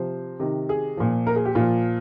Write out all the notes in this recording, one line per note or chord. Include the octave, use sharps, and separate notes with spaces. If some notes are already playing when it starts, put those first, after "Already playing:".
Already playing: C3 F3 C5
C3 D#3
G#4
A#2 F3
A#4
G#4
G4
A#2 F3 F4